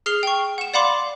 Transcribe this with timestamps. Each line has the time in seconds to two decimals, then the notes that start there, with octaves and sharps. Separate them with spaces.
0.06 G#4 F6 C7 F7 G7
0.23 G5 C#6
0.58 F#5 E7
0.74 D5 F5 F#5 B5 C6 D6